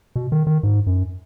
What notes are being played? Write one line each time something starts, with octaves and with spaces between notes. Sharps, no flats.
B2
D#3
D#3
G#2
F#2